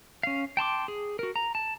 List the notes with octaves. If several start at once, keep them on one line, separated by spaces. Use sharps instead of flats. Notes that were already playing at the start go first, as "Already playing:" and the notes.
C#4 F5
G5 A5 C6 D6
G#4
F#4 A#4
A#5
A5